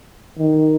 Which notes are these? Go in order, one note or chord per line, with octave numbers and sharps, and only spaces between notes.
D#3